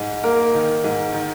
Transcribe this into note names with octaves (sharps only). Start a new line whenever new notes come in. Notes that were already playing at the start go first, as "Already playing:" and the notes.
Already playing: G#2
A#3 A#4
D#3
G#2
D#3